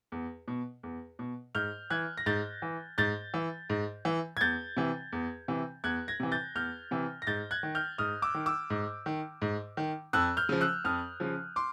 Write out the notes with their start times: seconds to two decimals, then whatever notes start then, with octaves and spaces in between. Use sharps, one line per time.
0.12 E2
0.48 B2
0.83 E2
1.19 B2
1.55 G#2 F6 G6
1.90 E3 F#6 G#6
2.18 A#6
2.26 G#2 G6 A6
2.62 E3
2.98 G#2 G6 A6
3.34 E3
3.70 G#2
4.05 E3
4.37 G#6
4.41 E2 G6 A6
4.77 C3 E3
5.12 E2
5.48 C3 E3
5.84 E2 F#6 G#6
6.08 G#6 A#6
6.20 C3 E3
6.32 G6 A6
6.55 E2 F6 G6
6.91 C3 E3
7.22 A#6
7.27 G#2 G6 A6
7.51 F#6 G#6
7.63 D#3
7.75 F6 G6
7.98 G#2 D#6 F6
8.22 D6 E6
8.34 D#3
8.46 D6 E6
8.70 G#2
9.06 D#3
9.42 G#2
9.77 D#3
10.13 F2 E6 F#6
10.37 F6 G6
10.49 C#3 F3
10.61 E6 F#6
10.85 F2 D#6 F6
11.20 C#3 F3
11.56 C6 D6